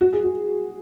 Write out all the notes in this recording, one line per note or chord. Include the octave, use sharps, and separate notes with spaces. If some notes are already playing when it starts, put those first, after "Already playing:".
F#4
G#4
F#4